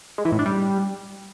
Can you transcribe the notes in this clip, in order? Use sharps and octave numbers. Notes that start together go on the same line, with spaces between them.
G#3
E3
A2
D4
G3